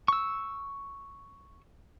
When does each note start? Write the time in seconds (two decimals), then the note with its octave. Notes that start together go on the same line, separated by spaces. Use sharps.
0.08 C#6 E6